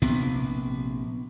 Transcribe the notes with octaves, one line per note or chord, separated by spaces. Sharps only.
A#1 C3 B3